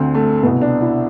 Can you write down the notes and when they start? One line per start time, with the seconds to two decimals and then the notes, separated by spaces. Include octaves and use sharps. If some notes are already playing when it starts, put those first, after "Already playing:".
Already playing: D2 D3 C4
0.15 A3
0.43 C2 B2 B3
0.62 D4
0.81 E4